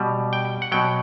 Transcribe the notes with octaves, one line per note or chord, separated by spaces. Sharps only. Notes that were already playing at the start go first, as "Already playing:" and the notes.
Already playing: B2 G3
G5
F#5
B2 F#3 G5